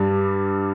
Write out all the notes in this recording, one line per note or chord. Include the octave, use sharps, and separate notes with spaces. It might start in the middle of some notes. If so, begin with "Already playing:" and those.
Already playing: G2 G3